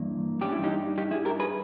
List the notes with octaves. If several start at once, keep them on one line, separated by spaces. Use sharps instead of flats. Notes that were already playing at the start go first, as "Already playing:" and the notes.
Already playing: G2 E3 A#3
G2 G3 C#4 G4
E4
D#4 G4
D#4 G4
E4 G#4
G4 A#4
G#4 B4